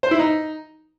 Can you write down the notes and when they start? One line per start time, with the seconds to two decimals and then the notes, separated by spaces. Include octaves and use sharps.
0.03 C5
0.11 E4
0.19 D#4